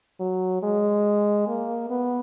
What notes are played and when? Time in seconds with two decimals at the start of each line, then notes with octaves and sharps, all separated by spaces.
0.20 F#3
0.63 G#3
1.48 A#3
1.90 B3